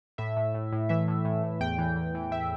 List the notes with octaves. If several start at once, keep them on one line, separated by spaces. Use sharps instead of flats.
A2 E5
A2
A2
A2
E3 E5
A2
A2
A2
E2 G5
E3
E2
E3
E3 E5